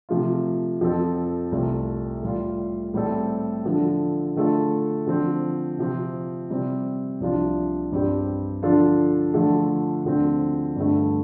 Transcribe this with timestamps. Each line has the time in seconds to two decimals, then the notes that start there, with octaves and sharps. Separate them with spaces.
0.09 C3 F3 A3 F4
0.81 F2 F3 C4 A4
1.52 C2 C3 A3 F4
2.23 A2 G3 F4
2.94 A2 G3 C4 A4
3.65 D3 F3 D4 A4
4.36 D3 A3 F4 A4
5.07 D3 F3 C4
5.78 C3 F3 C4
6.50 C3 G3 C4
7.21 C2 C3 F3 D4 F4
7.92 G2 G3 C4 G4
8.63 D3 F3 D4 F4 A4
9.34 D3 F3 A3 F4 A4
10.05 D2 D3 F3 C4
10.76 G2 D3 A3